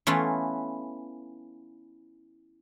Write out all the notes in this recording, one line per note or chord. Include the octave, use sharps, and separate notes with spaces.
E3 A3 B3 C#4 E4 F4